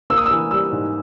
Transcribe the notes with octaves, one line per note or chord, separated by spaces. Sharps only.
A#3 E6
D#6
E3 E6
G3 E6
G#2